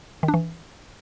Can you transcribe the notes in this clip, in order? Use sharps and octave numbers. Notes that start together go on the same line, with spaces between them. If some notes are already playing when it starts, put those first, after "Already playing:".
D#3
D4
E3